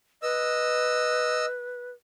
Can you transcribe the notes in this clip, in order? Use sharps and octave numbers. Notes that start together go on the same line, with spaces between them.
B4 D#5 E6